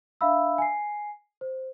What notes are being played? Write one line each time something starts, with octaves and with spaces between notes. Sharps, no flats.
D4 E5 F5 B5 E6
G#5 C7
C5